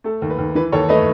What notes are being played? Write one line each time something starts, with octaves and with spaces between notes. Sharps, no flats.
A3 A4
D#2
B4
D#2
E3 B4
D#2 A4 C#5
A3 B4 D#5